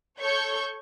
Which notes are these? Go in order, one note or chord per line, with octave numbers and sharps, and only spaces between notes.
A4 C#5 C#6 G6